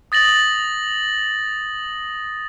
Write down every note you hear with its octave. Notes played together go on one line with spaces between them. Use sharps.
D#6 A6 A#6 F#7